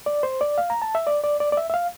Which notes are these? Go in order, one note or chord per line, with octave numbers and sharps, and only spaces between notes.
D5
C5
D5
F5
A#5
A5
E5
D5
D5
D5
D5
E5
E5
F5